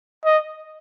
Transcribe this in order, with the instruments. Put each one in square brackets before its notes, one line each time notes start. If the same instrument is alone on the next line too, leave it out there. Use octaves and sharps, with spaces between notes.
[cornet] D#5